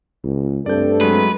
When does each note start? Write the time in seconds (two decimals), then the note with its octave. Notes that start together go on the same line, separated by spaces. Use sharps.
0.24 C#2
0.66 G2 A3 C4 A4 D5 G6
1.01 F#3 G#3 B4